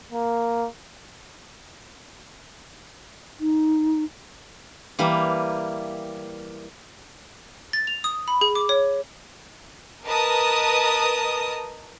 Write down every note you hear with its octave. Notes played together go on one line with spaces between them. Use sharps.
A#3
D#4
E3 G3 A#3
A6
F7
D#6
B5
G#4
D6
C#5
A#4 B4 D#5 A5 D#6